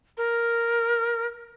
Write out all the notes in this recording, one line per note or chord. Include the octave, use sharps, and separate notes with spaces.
A#4